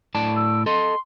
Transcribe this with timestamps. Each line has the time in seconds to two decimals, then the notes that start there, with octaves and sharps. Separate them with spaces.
0.15 A2 D5 A5
0.36 E6
0.66 A4 D#5 C6